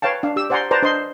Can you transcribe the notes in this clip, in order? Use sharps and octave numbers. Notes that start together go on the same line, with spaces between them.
B4 C#5 F5 G5 A5
D4 F5
G4 E6
C5 D5 F#5 G#5 A#5 C6
B4 C5 D5 A5 A#5
D4 C5 D#5 C6